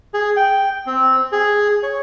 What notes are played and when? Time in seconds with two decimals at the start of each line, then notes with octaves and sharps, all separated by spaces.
0.14 G#4
0.36 G5
0.87 C4
1.32 G#4
1.83 C#5